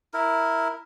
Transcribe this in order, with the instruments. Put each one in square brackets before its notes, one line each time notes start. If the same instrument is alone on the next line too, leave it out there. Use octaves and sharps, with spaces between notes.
[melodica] E4 A#4